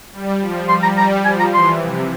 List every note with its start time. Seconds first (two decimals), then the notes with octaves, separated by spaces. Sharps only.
0.13 G3
0.41 F3
0.69 G3 C6
0.83 A#5
0.97 G3 A#5
1.25 F3 G#5
1.39 A#5
1.53 E3 C6
1.82 C3